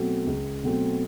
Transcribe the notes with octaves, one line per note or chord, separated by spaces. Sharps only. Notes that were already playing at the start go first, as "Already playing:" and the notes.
Already playing: B2 F#3 A3 C4
C#2
B2 F#3 A3 C4